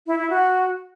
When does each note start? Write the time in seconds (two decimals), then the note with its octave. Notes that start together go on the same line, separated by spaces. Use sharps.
0.07 E4
0.18 E4
0.30 F#4